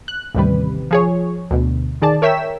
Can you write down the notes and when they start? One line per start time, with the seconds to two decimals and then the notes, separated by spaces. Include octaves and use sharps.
0.08 F#6
0.35 A1 D#2 C3 G3 B4
0.91 F3 G#4 C#5
1.51 D2 B2
2.02 D#3 G#4 D5 A5
2.22 A#4 C#5 E5 G5 B6 E7